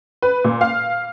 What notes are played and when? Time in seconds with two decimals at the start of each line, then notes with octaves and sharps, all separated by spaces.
0.22 B4
0.44 A#2
0.61 F5